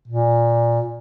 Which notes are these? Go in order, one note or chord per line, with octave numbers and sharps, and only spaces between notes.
A#2